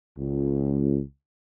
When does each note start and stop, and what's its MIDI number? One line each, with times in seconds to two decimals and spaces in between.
0.18 0.98 37